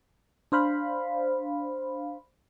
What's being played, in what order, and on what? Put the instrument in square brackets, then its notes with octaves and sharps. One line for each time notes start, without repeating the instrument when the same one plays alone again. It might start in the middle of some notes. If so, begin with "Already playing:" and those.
[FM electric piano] D4 C5 F5 B5